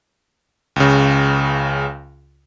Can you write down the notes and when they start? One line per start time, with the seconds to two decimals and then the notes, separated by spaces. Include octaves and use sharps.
0.76 C#2 C#3